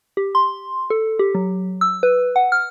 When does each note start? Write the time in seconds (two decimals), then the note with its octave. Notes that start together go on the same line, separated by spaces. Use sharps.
0.17 G4
0.35 C6
0.90 A4
1.19 G4
1.35 F#3
1.81 E6
2.03 B4
2.36 F#5
2.52 F6